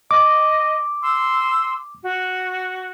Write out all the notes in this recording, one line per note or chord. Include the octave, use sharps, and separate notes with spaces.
D#5 D6
C6 E6
F#4